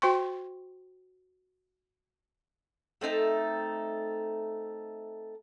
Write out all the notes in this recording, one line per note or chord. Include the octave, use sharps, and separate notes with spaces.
F#4 C5 G5 C6 C#6
A3 C4 D#4 A4